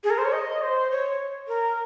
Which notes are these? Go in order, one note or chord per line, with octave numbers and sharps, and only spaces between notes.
G#4
A#4
C5
C#5
D#5
C5
C#5
A#4